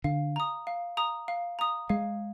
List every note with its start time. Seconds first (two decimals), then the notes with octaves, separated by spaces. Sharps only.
0.04 D3 F5
0.36 A#5 D#6
0.67 F5
0.97 A#5 D#6
1.28 F5
1.59 A#5 D#6
1.89 G#3 F5